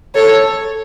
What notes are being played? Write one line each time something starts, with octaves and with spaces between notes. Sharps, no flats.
A4 C#5